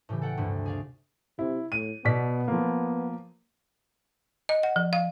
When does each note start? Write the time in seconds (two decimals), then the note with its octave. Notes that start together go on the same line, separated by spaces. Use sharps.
0.09 A2 C#3 E3 G4
0.22 A4 F#5 G5
0.37 D2 G2 C3
0.66 G#4 D5 F5
1.39 C3 E4
1.72 A2 D#7
2.05 B2 B3 D5 B6
2.48 F3 A#3
4.49 D#5
4.63 F#5
4.76 F3
4.93 F5